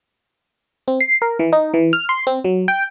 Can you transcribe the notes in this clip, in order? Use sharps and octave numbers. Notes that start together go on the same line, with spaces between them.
C4
C7
A#4
E3
D#4
E3
F6
C6
C4
F#3
G5